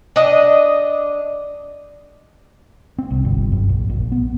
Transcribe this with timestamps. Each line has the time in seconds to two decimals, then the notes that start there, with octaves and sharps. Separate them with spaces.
0.16 D4 D#5
2.98 C4
3.11 C2
3.25 G1
3.52 F#2
3.69 A#1
3.89 A#1
4.12 B3